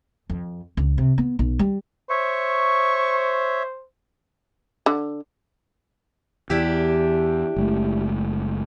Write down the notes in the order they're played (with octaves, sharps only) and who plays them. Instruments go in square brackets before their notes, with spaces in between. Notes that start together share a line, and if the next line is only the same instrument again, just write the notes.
[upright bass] F2
C#2
C3
B3
B1
G3
[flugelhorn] C5 [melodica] C#5 E5 [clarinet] C#6
[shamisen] D3
[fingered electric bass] E2 [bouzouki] D4 E4 G4
[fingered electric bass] F#1 G#3 A3